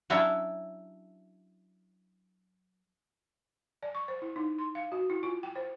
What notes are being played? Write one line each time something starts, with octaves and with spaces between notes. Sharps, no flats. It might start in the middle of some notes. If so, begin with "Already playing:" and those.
F#3 C#4 D4 E4 E5
D5
C#6
C5
E4
D#4
C6
F5
F#4
E4
F4
G5
C5